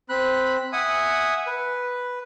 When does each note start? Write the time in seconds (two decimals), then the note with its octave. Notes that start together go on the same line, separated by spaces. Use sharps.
0.09 C4 B5 F#6
0.73 E5 F#5 G#5 D#6
1.47 B4